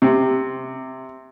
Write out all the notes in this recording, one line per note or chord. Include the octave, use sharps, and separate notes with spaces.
C3